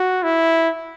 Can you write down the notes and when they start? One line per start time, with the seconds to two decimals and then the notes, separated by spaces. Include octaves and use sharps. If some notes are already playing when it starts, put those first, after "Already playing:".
Already playing: F#4
0.23 E4